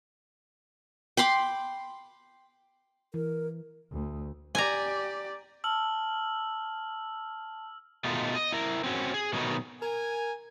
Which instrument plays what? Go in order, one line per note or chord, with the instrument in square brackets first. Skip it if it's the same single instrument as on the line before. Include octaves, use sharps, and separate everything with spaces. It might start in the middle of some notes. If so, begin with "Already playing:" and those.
[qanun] G5 B5 C6 D6
[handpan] E3 [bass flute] A#4
[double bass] D2
[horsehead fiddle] G4 D5 [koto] G#5 A#5
[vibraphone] A5 [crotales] E6 F6 F#7
[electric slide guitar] B2 D#3 G#3 A3 D#4 F4
D#5
E4 A#4
C4 C#4 F#4
G#4
B2 D#3 F#3 A3 D#4
[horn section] A#4 G#5